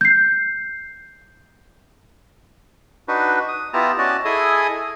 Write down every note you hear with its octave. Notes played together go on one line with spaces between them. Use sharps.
G6 C7
D4 D#4 F#4 B4
D#6
B3 E4 F4 G4 A5 A#5
C#4 F#4 D5 D#5 A5
E4 G#4 A4 D#5 G#5 D#6